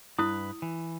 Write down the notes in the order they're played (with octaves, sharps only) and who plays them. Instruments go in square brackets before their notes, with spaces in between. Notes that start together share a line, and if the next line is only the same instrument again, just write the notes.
[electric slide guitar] G2 B4 [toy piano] E4 D#6
[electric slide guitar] E3